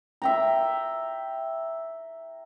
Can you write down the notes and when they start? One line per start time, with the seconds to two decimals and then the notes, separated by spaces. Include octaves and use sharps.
0.22 E5 G5 A#5